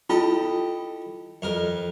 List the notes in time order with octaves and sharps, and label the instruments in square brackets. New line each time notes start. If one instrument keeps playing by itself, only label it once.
[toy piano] E4 F4 [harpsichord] G4 A4 D#5
[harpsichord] F2 A#4